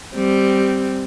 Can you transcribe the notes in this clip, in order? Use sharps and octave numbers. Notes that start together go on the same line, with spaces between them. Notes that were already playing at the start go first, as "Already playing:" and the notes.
G3 C4